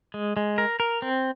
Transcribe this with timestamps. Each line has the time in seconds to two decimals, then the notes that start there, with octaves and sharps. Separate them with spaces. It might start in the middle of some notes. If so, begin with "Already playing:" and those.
0.14 G#3
0.37 G#3
0.58 A#4
0.80 A#4
1.02 C4